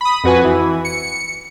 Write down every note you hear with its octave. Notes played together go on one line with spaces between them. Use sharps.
B5 D#6
F2 F#4 B4 G#5
E3
C#7